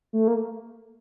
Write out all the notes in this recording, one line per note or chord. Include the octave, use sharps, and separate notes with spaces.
A3
A#3